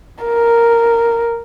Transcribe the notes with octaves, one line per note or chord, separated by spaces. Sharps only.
A#4